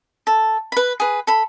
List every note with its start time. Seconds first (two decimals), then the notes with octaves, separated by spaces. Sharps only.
0.27 A4
0.72 B4 B5
1.00 G#4 B4
1.27 A4 B5